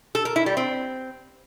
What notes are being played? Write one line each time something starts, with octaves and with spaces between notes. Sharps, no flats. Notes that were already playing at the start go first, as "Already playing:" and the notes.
A4
A#4
E4
G3
C4